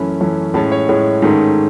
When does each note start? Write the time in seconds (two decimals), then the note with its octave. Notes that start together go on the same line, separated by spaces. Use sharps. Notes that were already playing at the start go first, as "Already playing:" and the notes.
Already playing: F#2 E3 A3 C#4 B5
0.21 F#2 E3 A3 C#4
0.54 A2 G#3 C#4 A5
0.72 C#5
0.89 A2 G#3 C#4
1.22 G#2 D#3 A3 C#4